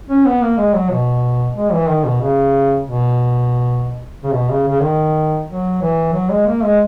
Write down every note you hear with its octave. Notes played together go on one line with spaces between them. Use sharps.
C#4
B3
A#3
G#3
F#3
B2
G#3
E3
D#3
B2
C#3
B2
C#3
B2
C#3
C#3
D#3
F#3
E3
F#3
G#3
A#3
G#3